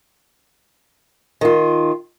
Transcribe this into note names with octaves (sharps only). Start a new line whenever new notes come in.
D#3 F4